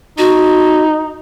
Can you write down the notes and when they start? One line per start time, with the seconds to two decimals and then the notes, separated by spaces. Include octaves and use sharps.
0.18 D#4 F#4